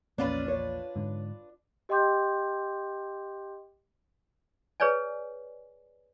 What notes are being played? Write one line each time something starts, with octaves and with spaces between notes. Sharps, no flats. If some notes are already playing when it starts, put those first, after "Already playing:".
A#1 E2 A#3 C#4 D4 F4 B4
C#5
G#2 D3
G4 D#5 G5 C6 D6 G6
G#4 B4 C#5 D5 G#5